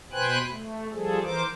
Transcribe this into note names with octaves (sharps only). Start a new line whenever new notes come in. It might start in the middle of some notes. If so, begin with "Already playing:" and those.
B2 B4 C5 G5 G#5 F#6
A3
F3 G3 G#4 A4
E3 A#4 C5 D6